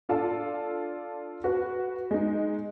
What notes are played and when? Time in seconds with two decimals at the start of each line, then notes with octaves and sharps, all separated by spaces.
0.09 D4 F4 A4 D5 A5
1.44 F#4 B4
2.11 G#3 D#4